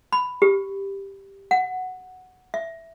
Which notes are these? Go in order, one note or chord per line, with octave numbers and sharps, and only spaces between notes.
B5
G4
F#5
E5